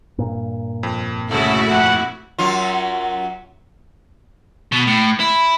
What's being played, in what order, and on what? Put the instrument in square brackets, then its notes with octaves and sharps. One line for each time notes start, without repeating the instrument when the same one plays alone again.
[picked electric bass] G2 A#2
[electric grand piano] F2
[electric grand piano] C2 C#3 [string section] A3 E4 F#4 [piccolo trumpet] A4
[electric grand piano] F2 [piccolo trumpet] F#5
[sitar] F#2 F#3 F4
[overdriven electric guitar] B2
A2
E4